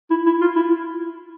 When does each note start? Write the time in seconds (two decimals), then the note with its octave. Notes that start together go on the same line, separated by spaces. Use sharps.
0.10 E4
0.26 E4
0.41 F4
0.56 E4